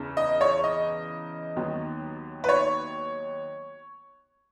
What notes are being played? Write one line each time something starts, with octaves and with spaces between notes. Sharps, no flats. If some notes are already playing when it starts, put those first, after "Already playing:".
Already playing: E2 C#3 E3
D#5
C#5
D#5
D#2 D#3 F#3 B3
B4
C#5